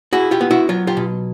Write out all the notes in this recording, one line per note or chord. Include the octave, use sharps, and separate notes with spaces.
E4 F#4 G#4
F4 G4
B3
E4 F#4
F#3 F4
F4 G4
B2